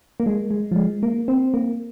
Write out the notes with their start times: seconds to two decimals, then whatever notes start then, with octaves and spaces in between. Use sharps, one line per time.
0.20 A#3
0.26 G#3
0.51 G#3
0.71 F3
0.76 G#3
1.03 A#3
1.28 C4
1.54 A#3